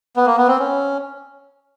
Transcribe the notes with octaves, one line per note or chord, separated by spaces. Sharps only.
B3
A#3
B3
C4
C#4